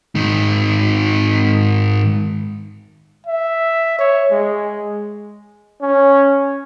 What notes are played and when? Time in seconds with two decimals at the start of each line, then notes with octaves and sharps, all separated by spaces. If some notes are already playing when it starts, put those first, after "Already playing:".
0.15 G#2 D#3
3.27 E5
3.99 C#5
4.31 G#3
5.81 C#4